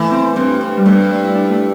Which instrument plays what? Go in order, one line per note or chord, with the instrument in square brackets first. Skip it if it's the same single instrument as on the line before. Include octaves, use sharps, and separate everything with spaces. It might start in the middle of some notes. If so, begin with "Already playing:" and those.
Already playing: [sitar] E3 [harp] A3
[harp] C4
[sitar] G2 [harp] C4
[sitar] G2
[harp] G3
[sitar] G2 [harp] A3
[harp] A3
D4
E4
D4
A3